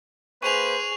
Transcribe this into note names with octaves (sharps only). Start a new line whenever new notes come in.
A#3 G#4 B4 C5 C#6 D#7 F7